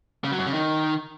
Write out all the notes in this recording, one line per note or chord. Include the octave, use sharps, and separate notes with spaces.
C#3
F#3
F#2
C#3
D#3